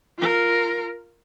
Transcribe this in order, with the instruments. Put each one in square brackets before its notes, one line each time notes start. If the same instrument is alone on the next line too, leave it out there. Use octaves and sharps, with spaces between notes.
[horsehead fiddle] F4 A#4